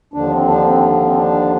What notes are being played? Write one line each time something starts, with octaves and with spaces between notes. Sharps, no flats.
D#2 D3 F3 D4
C4
D4
C4
C4
D4